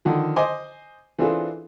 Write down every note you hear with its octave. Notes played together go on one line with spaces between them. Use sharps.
D3 D#3 F3
C5 D#5 G#5 C6 D6
E3 C4 D4 F4 G#4 A4